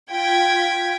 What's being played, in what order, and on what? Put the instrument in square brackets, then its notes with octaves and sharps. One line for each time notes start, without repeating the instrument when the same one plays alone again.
[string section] F4 G5 G#6 B6